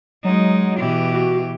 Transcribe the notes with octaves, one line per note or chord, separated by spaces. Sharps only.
F#3 G#3 D#4
B2 E3 G4
F#4